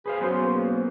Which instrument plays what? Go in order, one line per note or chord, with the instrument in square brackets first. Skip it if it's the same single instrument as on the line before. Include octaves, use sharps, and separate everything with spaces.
[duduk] G#4 [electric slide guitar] B4 C5 F5
[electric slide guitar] F#3 B3 C#4 [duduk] C5
[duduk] A#3